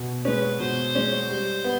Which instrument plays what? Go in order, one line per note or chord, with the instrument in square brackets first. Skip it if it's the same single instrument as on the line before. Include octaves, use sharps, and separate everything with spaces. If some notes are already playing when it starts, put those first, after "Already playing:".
Already playing: [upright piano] B2
[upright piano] G#3 C#4 [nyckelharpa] B4
[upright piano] B2 [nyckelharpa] C5
[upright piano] G#3 C#4
G3
B3